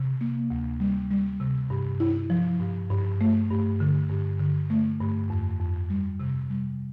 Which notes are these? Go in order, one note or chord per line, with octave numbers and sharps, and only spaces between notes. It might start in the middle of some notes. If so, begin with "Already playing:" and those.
Already playing: C3
A#3
D2
G3
G3
C3
G2
E4
F3
G2
G2
A3
G2
D3
G2
D3
A3
G2
F2
F2
G3
C3
G3